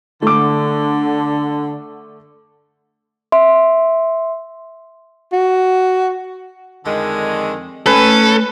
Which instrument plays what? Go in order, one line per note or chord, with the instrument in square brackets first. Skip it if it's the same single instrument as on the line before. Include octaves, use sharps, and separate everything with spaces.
[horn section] D3 [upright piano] A3 D6
[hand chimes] E5 C6
[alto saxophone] F#4
[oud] F2 [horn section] D3 D#3 G#3
[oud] A3 C4 D#4 [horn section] C#4 [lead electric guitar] A4 [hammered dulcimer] B4